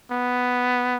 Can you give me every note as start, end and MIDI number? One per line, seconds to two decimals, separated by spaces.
0.11 0.97 59